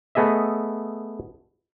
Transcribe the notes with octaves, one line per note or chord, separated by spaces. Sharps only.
A3 B3 G#4 D#5 E5